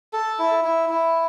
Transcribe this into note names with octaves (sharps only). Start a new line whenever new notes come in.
A4
E4
E4
E4